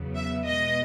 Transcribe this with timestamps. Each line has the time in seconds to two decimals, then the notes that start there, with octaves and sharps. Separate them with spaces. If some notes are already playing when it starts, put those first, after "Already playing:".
Already playing: E2 C#3 F#3 B3
0.16 E5
0.46 B2 G#3 B3 D#5